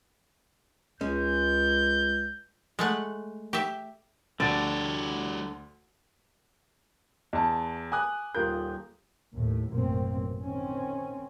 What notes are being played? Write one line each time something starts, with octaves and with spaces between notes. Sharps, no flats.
C#2 G#3 C#4 G6
G#3 A3 F#5
G4 E5
D2 D3 G3 F#4 D5 A6 D7
E2 A5
G#5 D6 D#6 F#6
D#1 F4 A#4 G6
D#2 A2
A1 F#2 B2 A#3 C4
D#3 C4 C#4